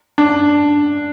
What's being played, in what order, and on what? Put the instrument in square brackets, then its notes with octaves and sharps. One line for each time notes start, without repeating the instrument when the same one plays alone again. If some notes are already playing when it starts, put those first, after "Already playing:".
[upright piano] D4